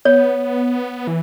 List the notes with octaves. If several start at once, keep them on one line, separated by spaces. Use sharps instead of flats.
B3 C#5
E3